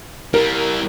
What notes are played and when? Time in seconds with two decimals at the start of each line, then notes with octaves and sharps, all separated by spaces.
0.34 G3 E4 A#4